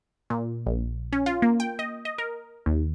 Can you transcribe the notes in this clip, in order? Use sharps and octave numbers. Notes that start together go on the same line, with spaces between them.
A#2
A#1
C#4
F4
A#3
G5
D#5
D#5
A#4
D#2